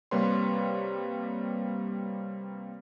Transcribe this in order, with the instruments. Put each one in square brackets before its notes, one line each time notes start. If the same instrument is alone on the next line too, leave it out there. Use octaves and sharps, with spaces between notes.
[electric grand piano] C3 G3 A#3 B4 C#5 C6